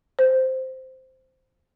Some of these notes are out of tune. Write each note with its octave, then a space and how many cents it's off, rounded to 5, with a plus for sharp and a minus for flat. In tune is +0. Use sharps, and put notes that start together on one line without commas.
C5 -5